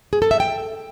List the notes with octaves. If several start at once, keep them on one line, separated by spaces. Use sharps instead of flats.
G#4
A4
E5
G5